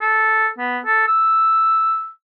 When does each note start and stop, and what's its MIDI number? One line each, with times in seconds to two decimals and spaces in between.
0.01 0.48 69
0.58 0.79 59
0.85 1.03 69
1.07 2.09 88